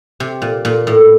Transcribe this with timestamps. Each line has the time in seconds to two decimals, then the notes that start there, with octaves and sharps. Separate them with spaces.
0.20 C3
0.42 A#2
0.65 A#2
0.87 A2